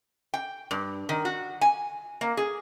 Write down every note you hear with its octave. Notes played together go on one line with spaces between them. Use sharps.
G5
G2
D#3
F#4
G#5
A#3
G#4